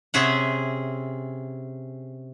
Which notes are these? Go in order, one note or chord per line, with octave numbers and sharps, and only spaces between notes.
C3 C4 C#4 G#4 E5 F#5